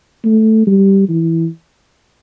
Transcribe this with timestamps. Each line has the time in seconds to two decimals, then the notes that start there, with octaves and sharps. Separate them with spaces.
0.25 A3
0.67 G3
1.09 E3